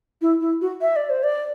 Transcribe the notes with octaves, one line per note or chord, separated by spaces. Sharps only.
E4
E4
F#4
E5
D5
C5
D5